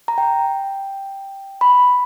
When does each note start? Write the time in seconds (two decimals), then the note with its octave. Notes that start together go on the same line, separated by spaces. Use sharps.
0.08 A#5
0.18 G5
1.61 B5